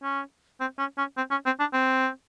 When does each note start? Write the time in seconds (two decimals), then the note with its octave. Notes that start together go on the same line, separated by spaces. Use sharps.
0.03 C#4
0.60 C4
0.79 C#4
0.98 C#4
1.17 C4
1.31 C#4
1.46 C4
1.60 D4
1.73 C4